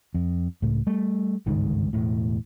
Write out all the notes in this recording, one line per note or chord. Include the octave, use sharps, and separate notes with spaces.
F2
C#2 A2
G3 A3
G1 C#2 G#2 D#3
E1 A2